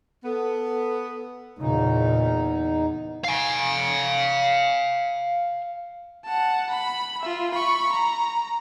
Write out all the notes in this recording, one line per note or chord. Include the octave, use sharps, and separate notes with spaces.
B3 A4
E2 A#2 C#3 D#4
F5 G#5
F#5 A5
B5
F4 E5
B5 C#6
A#5